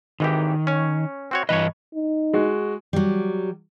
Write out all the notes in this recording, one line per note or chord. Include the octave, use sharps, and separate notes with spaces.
G#1 D#3 E3 G4
C#4 C#5
C4 F#4 C#5
G2 E3 B4 C#5 D#5
D#4
G#3 F#4
F#3 G3